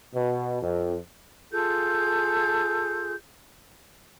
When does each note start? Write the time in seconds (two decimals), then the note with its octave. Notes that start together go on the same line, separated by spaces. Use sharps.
0.14 B2
0.62 F2
1.51 F4 G#4 A4 G6